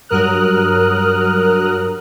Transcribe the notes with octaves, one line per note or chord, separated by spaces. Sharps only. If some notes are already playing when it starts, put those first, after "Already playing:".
G2 F#3 A#4 D#6 F6 F#6